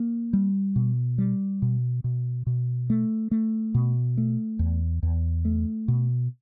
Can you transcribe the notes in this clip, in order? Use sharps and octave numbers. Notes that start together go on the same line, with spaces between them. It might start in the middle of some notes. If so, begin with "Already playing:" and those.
Already playing: A#3
G3
B2
G3
B2
B2
B2
A3
A3
B2
A3
E2
E2
A3
B2